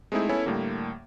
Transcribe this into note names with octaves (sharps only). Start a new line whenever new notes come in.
G#3 A3 C4 D#4 E4 G#4
B3 C#4 E4 A4 C#5 G#5
A2 D3 G3 A#3